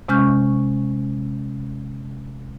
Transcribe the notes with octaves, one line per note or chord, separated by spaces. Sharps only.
C3 G#3 C#4 C#6 F6 G6